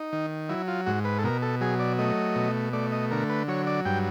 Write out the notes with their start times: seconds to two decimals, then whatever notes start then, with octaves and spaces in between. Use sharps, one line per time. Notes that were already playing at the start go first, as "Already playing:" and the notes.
Already playing: D#4
0.12 D#3
0.49 F#3 E4
0.68 F4
0.86 G#2 F#4
1.05 B4
1.19 A4
1.24 B2 A#4
1.42 A4
1.61 F#3 G#4
1.80 D5
1.99 A3 D#5
2.36 B2
2.73 A3 D5
2.92 D#5
3.11 D3 A#4
3.30 B4
3.48 F#3 C#5
3.67 D5
3.85 G2 G5